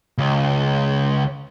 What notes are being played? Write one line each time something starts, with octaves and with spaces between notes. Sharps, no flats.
C#2